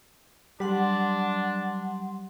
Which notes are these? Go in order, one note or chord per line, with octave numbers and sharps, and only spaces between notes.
F#3 G3 D4 F#5 C6